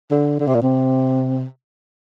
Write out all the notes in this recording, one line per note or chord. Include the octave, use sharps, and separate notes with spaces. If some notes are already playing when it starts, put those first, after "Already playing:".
D3
D3
C3
A#2
C3